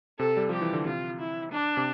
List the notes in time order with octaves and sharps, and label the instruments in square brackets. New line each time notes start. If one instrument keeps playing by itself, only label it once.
[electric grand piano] C3 [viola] A4
[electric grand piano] G3
[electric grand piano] F3 [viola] G4
[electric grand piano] E3
D3
[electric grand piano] C3 [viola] F4
[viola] E4
D4
[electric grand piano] C3